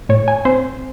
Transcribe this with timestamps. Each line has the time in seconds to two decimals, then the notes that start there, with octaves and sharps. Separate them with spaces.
0.09 A2 C#5
0.28 G#5
0.45 C4 C5